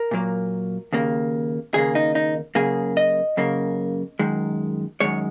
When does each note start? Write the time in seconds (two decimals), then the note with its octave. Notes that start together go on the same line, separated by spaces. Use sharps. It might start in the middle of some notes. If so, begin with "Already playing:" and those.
Already playing: A#4
0.11 A#2 F#3 A#3
0.93 D#2 C#3 A#3
1.74 D#2 C#3 A#3 G#4
1.95 D#4
2.15 D#4
2.55 F#2 C#3 A#3 G#4
2.97 D#5
3.37 F#2 C#3 A#3
4.19 F#2 D#3 G#3
5.00 F#2 D#3 G#3 C#5